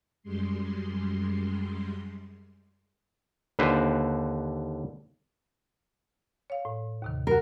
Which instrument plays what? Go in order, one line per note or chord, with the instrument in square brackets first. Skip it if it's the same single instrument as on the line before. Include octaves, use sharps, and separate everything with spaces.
[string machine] F#2 G3 G#3 C6
[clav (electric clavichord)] D#2 D3 B4 C5
[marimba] C#5 F5
A2
D#2 C3 D#3
[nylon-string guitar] F#4 A#4